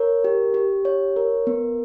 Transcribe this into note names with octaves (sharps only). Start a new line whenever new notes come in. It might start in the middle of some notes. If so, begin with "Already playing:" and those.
Already playing: A#4 C#5
G4
G4
C#5
A#4
B3